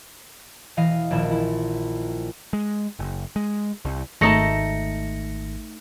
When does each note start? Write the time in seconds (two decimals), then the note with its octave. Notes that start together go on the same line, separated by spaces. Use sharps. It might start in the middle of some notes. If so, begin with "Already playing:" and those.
0.77 E1 E3 D#5 F5 D#7
1.10 D#1 A#1 E4 D5 E5 E7
1.31 E4
2.53 G#3
2.99 F#1
3.36 G#3
3.85 C2
4.21 G#1 A3 D#4 A5 A#6 C#7